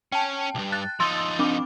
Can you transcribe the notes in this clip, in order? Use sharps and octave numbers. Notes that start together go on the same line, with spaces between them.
C#4 G5 A5
B1 G2
F#6 A6
F3 D#4 C6 E6 A6
C4 D4 D6